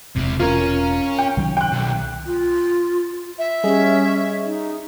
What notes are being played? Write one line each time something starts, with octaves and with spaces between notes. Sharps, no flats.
E1 C3 E4
C#4 F4 A#4 C#5
G5
C2 D#3 F#3
G5 F#6
B1
F4
E5
G3 C#4 G#4 D#5
D#4